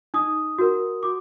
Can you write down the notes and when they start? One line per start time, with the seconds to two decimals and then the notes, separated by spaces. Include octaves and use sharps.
0.14 D#4 D#6
0.58 F#4 A#4
1.03 F#4 D6